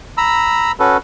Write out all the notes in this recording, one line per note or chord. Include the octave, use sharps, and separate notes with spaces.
A#5 B5 E6
C#4 F#4 A4 B4